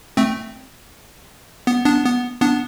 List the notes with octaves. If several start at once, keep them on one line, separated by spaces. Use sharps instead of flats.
A3 C4
B3
B3 D4
B3
B3 D4